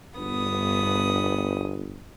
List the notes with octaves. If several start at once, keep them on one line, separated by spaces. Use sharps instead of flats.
G1 G2 B3 D#6